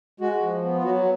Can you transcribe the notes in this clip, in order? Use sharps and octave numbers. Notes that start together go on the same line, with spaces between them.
G#3 F#4
F3
B3
F4
F#3 F#4